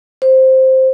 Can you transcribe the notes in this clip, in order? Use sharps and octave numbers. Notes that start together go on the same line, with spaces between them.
C5